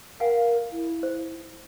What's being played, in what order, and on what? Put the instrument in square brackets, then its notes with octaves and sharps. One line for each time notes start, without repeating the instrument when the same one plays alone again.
[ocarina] A#4 [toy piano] F5 F#5 G#5
[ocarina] E4
[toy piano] C5